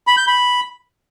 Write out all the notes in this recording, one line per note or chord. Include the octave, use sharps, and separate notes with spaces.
B5
G6
B5